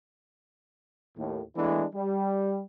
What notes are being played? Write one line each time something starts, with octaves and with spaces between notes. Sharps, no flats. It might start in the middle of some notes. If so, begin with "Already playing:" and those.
D#2 A2
E3 G#3 A3 B3 D4 E4
G3